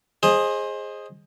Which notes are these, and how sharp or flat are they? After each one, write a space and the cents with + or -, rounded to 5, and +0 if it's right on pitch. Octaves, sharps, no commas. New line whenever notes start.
G#4 +0 C5 +25 D#5 +0